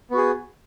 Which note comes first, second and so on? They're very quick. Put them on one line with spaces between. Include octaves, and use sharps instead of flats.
B3 F#4 G#4